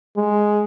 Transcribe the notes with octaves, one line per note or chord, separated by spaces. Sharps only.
G#3